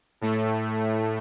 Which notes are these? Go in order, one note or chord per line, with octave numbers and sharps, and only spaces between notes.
A2 A3